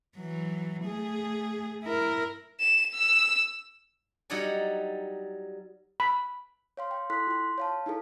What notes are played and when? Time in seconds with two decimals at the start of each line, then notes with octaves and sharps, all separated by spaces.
0.18 E3 F#3
0.85 A3 G#4
1.84 E4 A#4
2.61 E7
2.95 E6
4.30 F#3 G3 D#4 D5 F#5 G#5
6.00 B5
6.77 C#5 F5 C6
6.91 G5
7.10 E4 A4 C6 F#6 B6
7.27 F4 C6
7.58 C#5 F5 A5
7.86 D#4 E4 G#4 A4